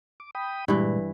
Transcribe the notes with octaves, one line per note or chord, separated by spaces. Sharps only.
D6
G5 B5 D#6
G2 A#2 E3 G#3